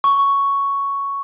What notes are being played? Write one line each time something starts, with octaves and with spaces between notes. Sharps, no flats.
C#6